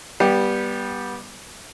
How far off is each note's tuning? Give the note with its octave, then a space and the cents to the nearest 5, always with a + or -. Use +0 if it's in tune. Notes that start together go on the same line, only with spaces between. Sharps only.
G3 +0 B3 -20 G4 +0